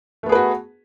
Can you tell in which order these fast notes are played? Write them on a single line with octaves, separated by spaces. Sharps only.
A3 B3 G#4 B4 F#4